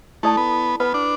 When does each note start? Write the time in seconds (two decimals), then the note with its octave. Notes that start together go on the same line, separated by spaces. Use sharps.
0.23 A3 E4 A4 D5 A5
0.37 B3
0.80 B3 B4 F#5 B5
0.94 D4